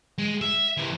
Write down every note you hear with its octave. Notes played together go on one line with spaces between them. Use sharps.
G#3
E5
C3 E3